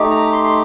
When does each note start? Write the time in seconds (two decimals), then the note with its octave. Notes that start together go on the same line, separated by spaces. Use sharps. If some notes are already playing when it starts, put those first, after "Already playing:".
Already playing: A3 D#4 G4
0.11 A#5
0.33 C6
0.44 C6